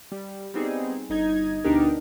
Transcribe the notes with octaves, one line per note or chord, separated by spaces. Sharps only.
G3
G3 B3 C4 D#4 G#4
G1 D#4 G#6
D2 B2 D4 D#4 G4 A#4